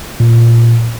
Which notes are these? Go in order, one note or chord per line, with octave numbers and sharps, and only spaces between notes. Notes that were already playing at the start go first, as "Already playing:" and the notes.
A#2